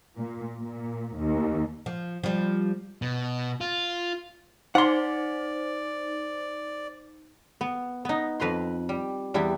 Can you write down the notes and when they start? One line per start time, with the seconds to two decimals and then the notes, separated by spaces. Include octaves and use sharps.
0.16 A#2
0.59 A#2
1.18 D#2
1.86 F3
2.23 F3 G3
3.02 B2
3.61 F4
4.75 D#4 C5 D5 F#5 C6
7.61 B3
8.05 B3 D#4
8.40 F2 B4 A#5 C6
8.89 G3
9.34 E2 G3 B3 E4